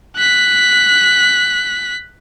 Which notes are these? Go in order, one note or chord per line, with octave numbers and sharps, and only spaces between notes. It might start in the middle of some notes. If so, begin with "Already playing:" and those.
F#6 B6